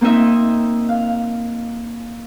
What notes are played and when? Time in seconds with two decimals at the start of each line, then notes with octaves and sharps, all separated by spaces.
0.01 A#3 C4 D#4 D#5 E5
0.89 F5